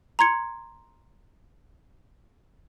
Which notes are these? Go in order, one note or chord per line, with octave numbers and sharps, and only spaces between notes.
A#5 C6 G#6 C#7